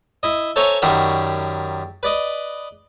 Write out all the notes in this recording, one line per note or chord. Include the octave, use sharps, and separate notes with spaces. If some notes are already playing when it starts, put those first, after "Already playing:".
E4 D#5
A4 C5 C#5 E5 G#5 A#5
F#2 D#3 G3 F#4
B4 D5 D#5